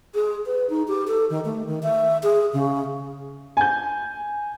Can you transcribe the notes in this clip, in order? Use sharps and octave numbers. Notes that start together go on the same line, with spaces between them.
G#4
B4
D#4
G4
A4
D#3
A3
D#3
E5
G#4
C#3
G#5 G6